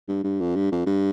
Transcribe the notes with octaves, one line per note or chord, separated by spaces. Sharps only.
G2
G2
F2
G2
F2
G2